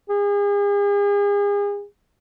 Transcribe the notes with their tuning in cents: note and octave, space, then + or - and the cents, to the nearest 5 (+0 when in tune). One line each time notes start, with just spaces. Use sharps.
G#4 -40